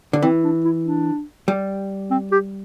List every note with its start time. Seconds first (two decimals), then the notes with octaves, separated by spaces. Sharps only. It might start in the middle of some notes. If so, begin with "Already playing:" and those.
0.13 D3
0.22 E3 C4
0.44 D4
0.65 E4
0.86 D4
1.48 G3
2.11 C4
2.32 G4